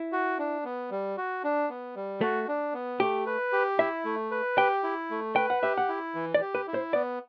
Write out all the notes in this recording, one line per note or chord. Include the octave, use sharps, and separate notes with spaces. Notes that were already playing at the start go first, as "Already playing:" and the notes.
Already playing: E4
F#4
D4
B3
G3
F#4
D4
B3
G3
A3 F#4
D4
B3
A3 G4
B4
G4
E4 E5
A3
B4
G4 G5
E4
A3
B4 G5
F#5
G4 E5
F#5
E4
E3
D5
G4
B4
E4
C5
B3 D5